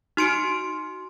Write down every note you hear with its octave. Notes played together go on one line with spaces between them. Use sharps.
D#4 F#4 C6 F6 C#7 D7